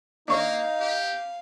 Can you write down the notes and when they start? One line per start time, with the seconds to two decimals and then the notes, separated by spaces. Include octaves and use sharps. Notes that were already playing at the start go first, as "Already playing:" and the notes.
0.28 A#3 D4 D#4 C#5 F5
0.80 G4